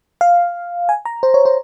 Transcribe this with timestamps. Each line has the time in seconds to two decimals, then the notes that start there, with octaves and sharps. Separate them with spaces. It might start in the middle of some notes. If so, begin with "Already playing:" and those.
0.21 F5
0.89 G#5
1.05 A#5
1.23 C5
1.34 C#5
1.45 C5